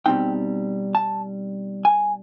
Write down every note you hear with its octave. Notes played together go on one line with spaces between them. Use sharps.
B2 G3 C4 D#4 G5
A5
G#5